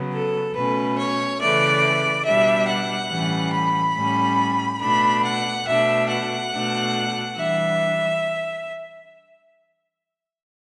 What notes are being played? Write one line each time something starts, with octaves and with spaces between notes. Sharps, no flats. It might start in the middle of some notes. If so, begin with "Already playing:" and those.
Already playing: C#3 F#3 B3
A4
B2 A3 C#4 B4
C#5
C#3 E3 A3 D5
B2 G3 D4 E5
F#5
A2 E3 G3 C#4
B5
A2 G3 C#4
B2 A3 D4 B5
F#5
B2 A3 D4 E5
F#5
B2 A3 D4
E3 G3 D4 E5